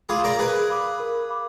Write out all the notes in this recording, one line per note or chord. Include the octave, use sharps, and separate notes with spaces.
F4 G#4 F5 B5 D6
A#4 D5
G#4 A#4 B4
F5 B5 D6
A#4
F5 B5 D6